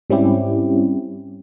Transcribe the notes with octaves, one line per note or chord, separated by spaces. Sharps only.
G#2 G3 C4 C#4 E4 G4